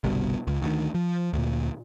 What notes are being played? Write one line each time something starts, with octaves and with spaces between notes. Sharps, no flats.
G1 C2 G2 B2
C#2
D2 D#3
F3
D2 A#2